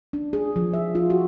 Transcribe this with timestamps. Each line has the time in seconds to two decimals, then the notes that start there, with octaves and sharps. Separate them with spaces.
0.13 D4
0.33 G#4
0.56 F3
0.73 E5
0.95 F4
1.10 F#4